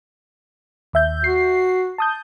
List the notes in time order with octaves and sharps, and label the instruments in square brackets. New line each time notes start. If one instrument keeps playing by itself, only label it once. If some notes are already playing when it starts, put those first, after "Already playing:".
[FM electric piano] D#2 E5 G6
[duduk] F#4 [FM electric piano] C7
[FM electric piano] A5 D#6 G6